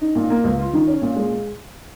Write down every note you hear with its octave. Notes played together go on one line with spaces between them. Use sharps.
D#4
A#2
A#3
C#2
F4
D#3
C#4
A#2
G#3